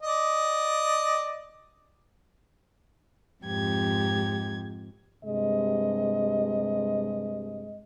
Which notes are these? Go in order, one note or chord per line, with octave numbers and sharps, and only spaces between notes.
D5 D#5
F2 G#2 G4 G#6
G2 C3 G#3 D#5